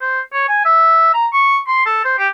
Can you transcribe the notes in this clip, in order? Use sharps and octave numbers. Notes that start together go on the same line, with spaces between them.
C5
C#5
G#5
E5
A#5
C#6
C6
A4
C5
G4